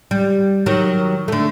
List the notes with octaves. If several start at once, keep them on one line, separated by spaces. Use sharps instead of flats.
G3
D#3 F#3
D3 A3